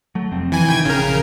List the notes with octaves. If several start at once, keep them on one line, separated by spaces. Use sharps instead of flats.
F#3 A3
F1 F2 C4
E3 G#5
C3 D#3 G5 G#6
A#1 C#3 A#4